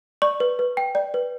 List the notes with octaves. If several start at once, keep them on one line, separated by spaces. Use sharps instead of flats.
D5 C#6
B4
B4
G5
D5
B4